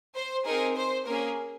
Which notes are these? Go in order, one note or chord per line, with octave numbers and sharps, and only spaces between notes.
C5
C4 D#4 G#4 A#4
C5
A#3 C#4 G#4 A#4